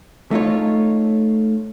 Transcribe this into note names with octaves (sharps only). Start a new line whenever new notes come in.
A3 D#4 F4 C#5